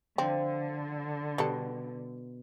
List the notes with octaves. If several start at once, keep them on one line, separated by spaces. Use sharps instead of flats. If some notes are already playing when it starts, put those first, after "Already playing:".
D3 F3 C4
B2 G3 A4